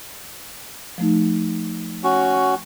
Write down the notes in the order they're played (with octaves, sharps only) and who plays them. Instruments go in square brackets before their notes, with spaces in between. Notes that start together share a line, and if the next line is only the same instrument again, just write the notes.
[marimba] F3 A3 D#4
[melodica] C#4 F#4